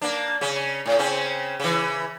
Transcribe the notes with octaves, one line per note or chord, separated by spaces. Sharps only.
A#3 D4
C#3 C#4
A2
C#3 C4 C#4
C#3 E3